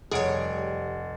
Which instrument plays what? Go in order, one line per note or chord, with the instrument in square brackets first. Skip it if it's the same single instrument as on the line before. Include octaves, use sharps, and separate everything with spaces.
[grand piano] F1 F#5 D7 [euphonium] G3 [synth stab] G#4 C#5